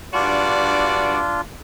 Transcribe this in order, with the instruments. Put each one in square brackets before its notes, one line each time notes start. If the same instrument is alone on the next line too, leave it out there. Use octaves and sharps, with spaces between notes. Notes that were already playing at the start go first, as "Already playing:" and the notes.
[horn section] G2 F#4 D5 [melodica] D4 F4